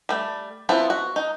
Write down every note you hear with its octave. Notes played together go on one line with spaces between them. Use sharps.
G3 A3
B3 C4 E4 F4 A4
F#4
D#4